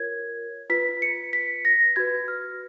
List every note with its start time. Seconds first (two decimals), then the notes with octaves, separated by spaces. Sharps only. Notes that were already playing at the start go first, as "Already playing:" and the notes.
Already playing: F4 A#4 C#5 G#6
0.70 F4 B4 B6
1.02 C#7
1.33 B6
1.65 A#6
1.96 F#4 B4 G#6
2.28 F6